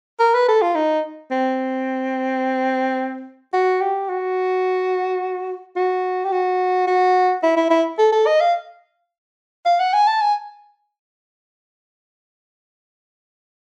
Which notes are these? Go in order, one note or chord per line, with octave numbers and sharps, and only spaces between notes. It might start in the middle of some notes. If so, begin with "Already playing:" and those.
A#4
B4
A4
F4
D#4
C4
F#4
G4
F#4
F#4
G4
F#4
F#4
E4
E4
E4
A4
A4
D#5
F5
F5
F#5
G#5
A5
G#5